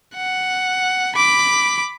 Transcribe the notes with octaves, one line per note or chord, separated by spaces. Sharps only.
F#5
B5 D6